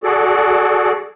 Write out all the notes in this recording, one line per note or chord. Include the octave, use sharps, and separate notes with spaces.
F#4 G#4 A4 D5